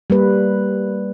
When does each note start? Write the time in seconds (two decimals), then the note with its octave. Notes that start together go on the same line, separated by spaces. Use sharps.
0.10 G3 A#3 B4